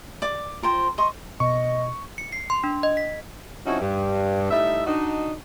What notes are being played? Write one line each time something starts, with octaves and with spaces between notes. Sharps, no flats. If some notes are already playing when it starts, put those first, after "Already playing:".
D5 D6
F4 A#4 C5 G5
D#5 C6 C#6
B2 D#5 C#6
C#7
C7
C6
D4
D#5
B6
F3 C4 C#4 D#4 E4 F#4
G2
A2 G3 D#4 E5
D4 D#4 F#4